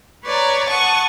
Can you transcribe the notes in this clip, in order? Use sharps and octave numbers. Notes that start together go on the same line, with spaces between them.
B4 C#5 D5 A#5
F#5 A5 C#6 D#6